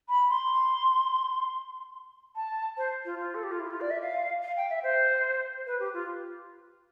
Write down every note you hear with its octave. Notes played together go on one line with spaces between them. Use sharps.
B5
C6
A5
C5
F4
F4
A4
G4
F4
E4
F4
D5
E5
F5
F5
G5
E5
C5
B4
G4
F4